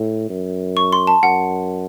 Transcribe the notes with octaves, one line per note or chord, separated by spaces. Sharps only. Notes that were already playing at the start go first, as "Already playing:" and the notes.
Already playing: A2
F#2
C#6
C6
A5
F#2 F#5